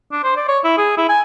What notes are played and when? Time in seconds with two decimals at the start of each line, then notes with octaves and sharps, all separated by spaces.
0.12 D4
0.24 C5
0.36 D5
0.48 C#5
0.64 E4
0.77 G#4
0.97 E4
1.09 G#5